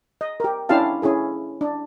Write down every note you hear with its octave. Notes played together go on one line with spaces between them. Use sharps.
D#5
G4 A#4
C#4 D4 E4 G4 F5 A5
C#4 E4 G#4 A4
D4